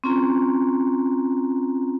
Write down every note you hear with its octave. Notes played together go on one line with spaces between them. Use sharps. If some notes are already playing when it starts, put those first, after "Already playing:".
C4 C#4 F4 A#5